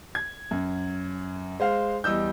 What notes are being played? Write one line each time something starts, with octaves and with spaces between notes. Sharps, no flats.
G#6
F#2
G#3 C5 F5
E2 G3 D#5 E6 G6